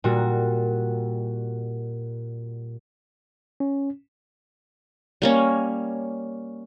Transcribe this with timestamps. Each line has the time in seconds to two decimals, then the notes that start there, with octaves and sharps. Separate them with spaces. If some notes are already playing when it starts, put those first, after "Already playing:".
0.04 A#2 G3 F#4
3.60 C#4
5.22 G3 A#3 C#4